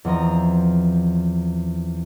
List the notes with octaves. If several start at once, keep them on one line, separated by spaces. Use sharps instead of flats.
E2 F3 C4 D#5 A#5